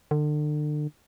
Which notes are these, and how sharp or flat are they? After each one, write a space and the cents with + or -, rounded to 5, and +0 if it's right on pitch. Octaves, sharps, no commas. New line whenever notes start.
D3 +35